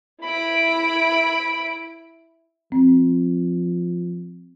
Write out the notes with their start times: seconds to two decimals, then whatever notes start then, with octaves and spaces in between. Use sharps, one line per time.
0.24 E4 B5 D7
2.72 F3 C4